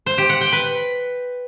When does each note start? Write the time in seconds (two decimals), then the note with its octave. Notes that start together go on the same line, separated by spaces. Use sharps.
0.06 C5
0.18 G4
0.29 F#5
0.41 G5
0.52 B4